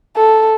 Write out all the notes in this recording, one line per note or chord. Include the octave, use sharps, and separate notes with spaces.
A4